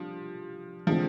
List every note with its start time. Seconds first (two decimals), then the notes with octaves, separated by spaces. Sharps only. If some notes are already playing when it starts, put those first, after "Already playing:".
Already playing: F3 G3 D4 G4
0.86 D3 F3 G#3 C4